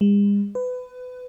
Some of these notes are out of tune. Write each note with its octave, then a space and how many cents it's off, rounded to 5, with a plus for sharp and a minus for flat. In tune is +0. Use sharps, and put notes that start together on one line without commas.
G#3 -45
B4 +25